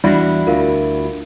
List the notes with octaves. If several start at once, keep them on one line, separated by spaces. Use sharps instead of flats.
E2 E3 G3 D4 E4 F#4
D2 F4 A#4 F5